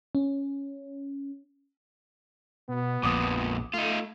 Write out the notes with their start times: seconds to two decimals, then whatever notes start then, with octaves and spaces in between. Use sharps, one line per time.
0.15 C#4
2.69 B2 B3
3.03 A#1 F2 A#2 D6 D#6
3.74 A3 D#4 F4